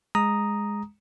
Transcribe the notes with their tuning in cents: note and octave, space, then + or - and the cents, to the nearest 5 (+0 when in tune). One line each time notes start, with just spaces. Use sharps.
G#3 -5 A#5 +0 D#6 +0